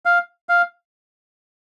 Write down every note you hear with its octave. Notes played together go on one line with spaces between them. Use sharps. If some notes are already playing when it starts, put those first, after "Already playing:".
F5
F5